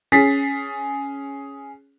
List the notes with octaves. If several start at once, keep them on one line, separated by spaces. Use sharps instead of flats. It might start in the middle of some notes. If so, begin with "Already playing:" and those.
C#4 G#4 A6 B6 C7